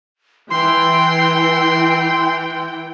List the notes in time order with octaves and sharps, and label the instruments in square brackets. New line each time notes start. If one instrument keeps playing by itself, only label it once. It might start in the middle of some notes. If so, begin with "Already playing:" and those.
[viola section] E3 G5 [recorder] C6